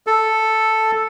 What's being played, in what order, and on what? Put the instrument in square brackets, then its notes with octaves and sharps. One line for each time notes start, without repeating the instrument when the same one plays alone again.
[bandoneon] A4